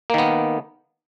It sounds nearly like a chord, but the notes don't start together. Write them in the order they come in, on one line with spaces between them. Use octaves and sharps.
A#3 D#3 B3